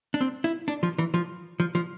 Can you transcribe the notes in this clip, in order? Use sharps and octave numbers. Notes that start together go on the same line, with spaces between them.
D4
C4
E4
D4
F3
E3
F3
F3
F3